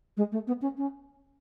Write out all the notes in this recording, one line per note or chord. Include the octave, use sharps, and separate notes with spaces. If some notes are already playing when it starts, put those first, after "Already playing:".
G#3
A3
B3
C#4
C#4